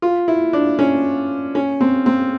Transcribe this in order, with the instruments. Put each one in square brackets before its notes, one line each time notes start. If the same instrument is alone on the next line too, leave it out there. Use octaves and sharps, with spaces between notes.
[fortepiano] F4
E4
D4
C#4
C#4
C4
C4